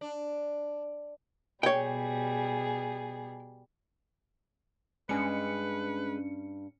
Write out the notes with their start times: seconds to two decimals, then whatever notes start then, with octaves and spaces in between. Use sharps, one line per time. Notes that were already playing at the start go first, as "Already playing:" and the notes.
0.01 D4
1.63 B2 G3 G#4 C#5 G5
5.09 G2 G#3 C#4 D4 B4 C#7